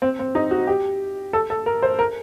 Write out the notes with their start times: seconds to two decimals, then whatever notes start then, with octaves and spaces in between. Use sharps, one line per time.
0.02 C4
0.19 C4
0.35 D#4
0.51 F#4
0.67 G4
1.33 A4
1.50 A4
1.66 A#4
1.83 C5
1.99 A#4